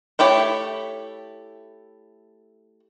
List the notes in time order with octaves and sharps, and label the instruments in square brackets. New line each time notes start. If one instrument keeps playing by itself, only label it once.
[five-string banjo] A3 E4 G4 C#5